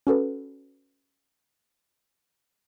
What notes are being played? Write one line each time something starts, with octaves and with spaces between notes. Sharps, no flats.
C#4 F#4 A4 B4